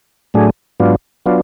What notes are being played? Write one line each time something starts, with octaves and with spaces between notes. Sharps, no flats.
A2 F#3 A3 D4 G#4
G#2 F#3 B3 D4 F4
F#3 B3 D4 F4